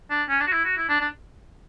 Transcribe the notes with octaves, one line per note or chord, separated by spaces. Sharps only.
D4
C#4
D4
F#4
E4
F#4
E4
D4
D4